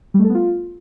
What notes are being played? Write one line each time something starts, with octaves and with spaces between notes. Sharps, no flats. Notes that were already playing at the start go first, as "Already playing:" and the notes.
G3
A3
A4
B3
F4